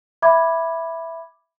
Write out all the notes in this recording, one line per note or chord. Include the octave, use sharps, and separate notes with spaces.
E5 B5 D6 G#6